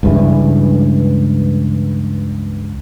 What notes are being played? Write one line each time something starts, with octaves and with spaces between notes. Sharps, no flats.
C#2 G2 E3